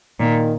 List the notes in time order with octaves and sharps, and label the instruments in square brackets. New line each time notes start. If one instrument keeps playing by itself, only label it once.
[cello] A#2 [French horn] D#3